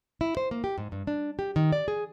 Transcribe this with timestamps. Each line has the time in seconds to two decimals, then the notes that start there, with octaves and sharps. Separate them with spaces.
0.21 E4
0.37 C5
0.51 A#3
0.64 G4
0.78 G#2
0.92 G2
1.07 D4
1.39 G4
1.56 D#3
1.72 D5
1.88 G#4